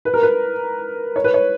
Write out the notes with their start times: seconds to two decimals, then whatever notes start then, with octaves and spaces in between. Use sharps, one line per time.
0.05 B4
0.14 A#4
0.23 B4
1.16 C#5
1.24 B4
1.34 C#5